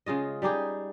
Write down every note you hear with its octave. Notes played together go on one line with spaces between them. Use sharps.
C#3 G#3 F4 D#5
G3 D#4 G4 G#4